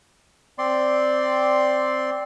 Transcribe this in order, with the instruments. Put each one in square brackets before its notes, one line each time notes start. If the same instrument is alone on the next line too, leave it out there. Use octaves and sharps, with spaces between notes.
[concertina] C4 D5 C6